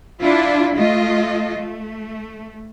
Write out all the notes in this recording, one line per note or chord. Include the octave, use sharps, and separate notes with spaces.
D4 E4 F4
A3 F4 D#5
A3